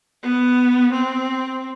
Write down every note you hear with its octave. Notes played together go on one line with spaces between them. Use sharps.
B3
C4